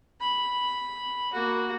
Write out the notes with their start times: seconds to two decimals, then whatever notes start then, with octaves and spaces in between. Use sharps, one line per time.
0.20 B5
1.33 A#3 F#4